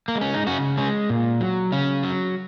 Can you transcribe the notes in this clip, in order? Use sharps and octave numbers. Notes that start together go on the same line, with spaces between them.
A#3
G#3
C#4
D#4
C#3 C#4 F#4
G#3 C#4
A#2
F#3
C#3 C#4
F#3